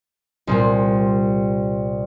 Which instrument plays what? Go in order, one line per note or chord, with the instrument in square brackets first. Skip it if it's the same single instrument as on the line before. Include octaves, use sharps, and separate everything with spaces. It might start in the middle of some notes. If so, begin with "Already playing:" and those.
[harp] C2 A#2 G3